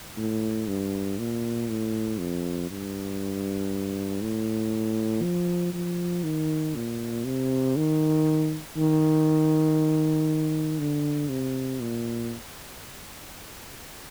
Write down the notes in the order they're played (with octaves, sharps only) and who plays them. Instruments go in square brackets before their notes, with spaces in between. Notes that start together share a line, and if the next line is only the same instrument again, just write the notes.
[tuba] A2
G2
A#2
A2
F2
G2
A2
F3
F3
D#3
A#2
C3
D#3
D#3
D3
C3
A#2